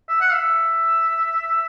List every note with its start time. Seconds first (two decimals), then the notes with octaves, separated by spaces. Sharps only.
0.08 E5
0.21 F#5
0.34 E5